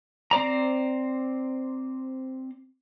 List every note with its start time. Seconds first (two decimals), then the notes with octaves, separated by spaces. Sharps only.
0.31 C4 C5 D5 A#5